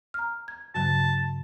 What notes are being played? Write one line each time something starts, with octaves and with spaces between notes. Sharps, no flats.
A#5 F6
G#6
G2 C#3 F#3 A5